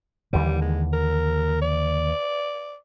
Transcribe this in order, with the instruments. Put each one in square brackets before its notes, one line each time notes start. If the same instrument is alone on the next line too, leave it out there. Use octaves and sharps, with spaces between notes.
[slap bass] D#2 D3 E3 [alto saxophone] G3
[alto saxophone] G#3
A#4
D5